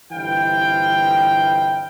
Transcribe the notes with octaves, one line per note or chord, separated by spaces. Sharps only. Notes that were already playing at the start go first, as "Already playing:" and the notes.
G1 E3 C4 E4 F5 G5